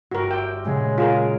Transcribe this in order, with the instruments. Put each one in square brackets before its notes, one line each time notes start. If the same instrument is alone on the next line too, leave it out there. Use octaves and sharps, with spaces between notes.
[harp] G1 [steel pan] F#4 A#4
[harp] E5 C6 D6 [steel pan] G5
[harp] A#2 C#3 F#3 [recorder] G#3
[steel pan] F4 G#4 A#4